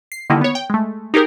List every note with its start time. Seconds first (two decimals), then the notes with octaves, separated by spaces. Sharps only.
0.12 C7
0.30 D3 D#3 G3 A#3 D#4 E4
0.41 B3 C#5
0.55 G5
0.70 G#3 A3
1.14 D#4 G4 G#4 A#4